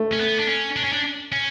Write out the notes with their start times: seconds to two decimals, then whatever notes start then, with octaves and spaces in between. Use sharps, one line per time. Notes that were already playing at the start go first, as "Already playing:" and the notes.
Already playing: A3
0.12 C#4
0.20 B3
0.39 D4
0.48 C#4
0.76 D4
0.84 C#4
0.93 D4
1.32 C#4